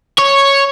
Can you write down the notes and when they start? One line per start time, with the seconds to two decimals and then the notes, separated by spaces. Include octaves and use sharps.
0.18 C#5